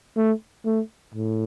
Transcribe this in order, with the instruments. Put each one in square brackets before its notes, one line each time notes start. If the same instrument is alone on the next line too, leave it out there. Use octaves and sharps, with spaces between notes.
[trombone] A3
A3
A2